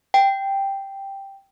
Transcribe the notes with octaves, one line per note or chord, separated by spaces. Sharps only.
G5